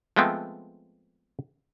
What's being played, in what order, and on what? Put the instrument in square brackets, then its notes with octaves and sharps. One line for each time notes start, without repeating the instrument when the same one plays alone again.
[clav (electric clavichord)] F3 G#3 A3 B3 C4